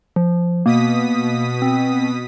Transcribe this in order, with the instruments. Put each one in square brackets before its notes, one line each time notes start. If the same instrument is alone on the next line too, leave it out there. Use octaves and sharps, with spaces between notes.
[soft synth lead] F3
[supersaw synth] B2 D#6 B6 [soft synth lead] A#3
[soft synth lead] C4